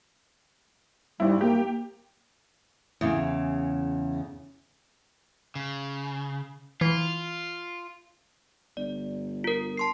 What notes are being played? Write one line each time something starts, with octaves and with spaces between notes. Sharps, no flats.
G#1 G3 E4
A#3 G4
E2 C#3
C#3
E3 F4
G1 D5
F4 A#4
A5 C6 C7